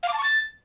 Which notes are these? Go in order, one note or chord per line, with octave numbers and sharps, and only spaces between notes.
F5
D6
A5
C#6
A6